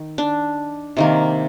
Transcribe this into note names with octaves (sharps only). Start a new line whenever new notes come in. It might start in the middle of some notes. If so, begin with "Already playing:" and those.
Already playing: D#3
D4
C3 D#3 A#3